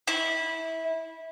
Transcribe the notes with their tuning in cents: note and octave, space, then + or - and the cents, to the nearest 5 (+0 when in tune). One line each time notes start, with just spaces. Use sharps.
E4 -20